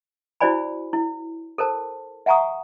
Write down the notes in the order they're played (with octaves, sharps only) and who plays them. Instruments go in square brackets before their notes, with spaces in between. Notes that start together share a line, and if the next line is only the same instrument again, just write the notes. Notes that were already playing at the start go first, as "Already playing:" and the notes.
[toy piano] E4 F#4 C5 D5 G#5 B5
E4
A4 A#4 C5 A5
E5 F#5 G#5 A#5 C#6 D#6